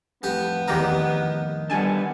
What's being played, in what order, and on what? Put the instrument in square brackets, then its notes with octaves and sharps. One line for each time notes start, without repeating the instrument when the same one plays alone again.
[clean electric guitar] F2 A2 [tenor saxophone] B3 [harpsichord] G4
[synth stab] E2 G4 A#5 [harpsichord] D#3
[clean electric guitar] D3 G3 B3 [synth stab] G#5 A5